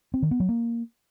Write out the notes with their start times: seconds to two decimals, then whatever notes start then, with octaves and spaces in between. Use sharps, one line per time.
0.14 C4
0.22 D#3
0.31 B3
0.40 F#3
0.49 A#3